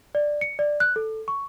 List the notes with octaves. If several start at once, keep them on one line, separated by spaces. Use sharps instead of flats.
D5
C#7
D5
F#6
A4
C#6